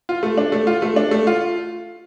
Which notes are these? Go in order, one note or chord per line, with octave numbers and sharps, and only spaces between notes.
F4
A3
D4
A3
F4
A3
D4
A3
F4